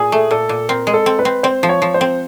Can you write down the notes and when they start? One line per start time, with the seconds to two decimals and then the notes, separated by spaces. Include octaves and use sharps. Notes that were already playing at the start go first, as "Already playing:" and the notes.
Already playing: A#2 G#4
0.12 A3
0.31 A#2 A4
0.49 A#2
0.69 C4 A#4
0.87 G#3
0.94 A4
1.06 C4
1.19 B4
1.25 C4
1.43 C4 C5
1.63 F3
1.69 C#5
1.82 F3
1.94 C5
2.01 C4